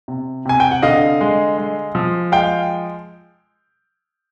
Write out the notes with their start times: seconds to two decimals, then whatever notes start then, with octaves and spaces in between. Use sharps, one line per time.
0.08 C3
0.45 C3 G#5
0.60 G5
0.71 F#5
0.82 D3 D#5 F5
1.21 G#3
1.58 G#3
1.95 F3
2.32 G#3 F5 G5